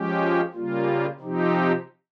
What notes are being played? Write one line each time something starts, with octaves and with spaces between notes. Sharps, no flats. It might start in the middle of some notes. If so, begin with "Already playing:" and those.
Already playing: F3 G#3 C#4 G4
C#3 G3 A#3 F4
C3 F3 C4 D#4 G4